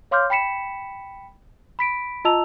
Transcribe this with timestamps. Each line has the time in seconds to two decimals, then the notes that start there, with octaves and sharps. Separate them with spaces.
0.11 C#5 F5 C6 D6 F6 G6
0.30 G5 B5 B6 C#7 E7
1.79 B5 B6 D7
2.25 F4 D#5 A5 A#5 E6 F7